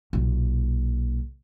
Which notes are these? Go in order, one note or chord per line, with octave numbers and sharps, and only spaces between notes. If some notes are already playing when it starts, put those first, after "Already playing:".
B1 A#2